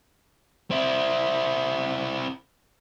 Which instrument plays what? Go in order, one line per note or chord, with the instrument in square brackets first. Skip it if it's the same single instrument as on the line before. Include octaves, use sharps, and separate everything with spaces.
[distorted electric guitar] C4 E4